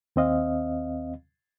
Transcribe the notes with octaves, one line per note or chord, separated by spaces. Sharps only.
D#2 C4 D#5 F5